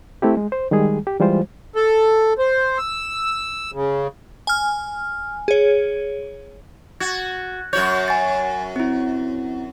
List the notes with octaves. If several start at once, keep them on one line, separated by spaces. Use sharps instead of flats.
A3 C4 E4 G4
G#3
C5
D#3 G3 G#3 G#4
G4
E3 G3 G#3 F4 C5
A4
C5
E6
C#3
G#5 F6
G#4 C#5
F#4 G#6 A6
F#2 F#4 C#5 G6
G#5 A6
C4 E4